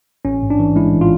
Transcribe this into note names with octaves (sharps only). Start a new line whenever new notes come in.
A1 C#4
G#2
D4
E3
G#3 E4
A1
F4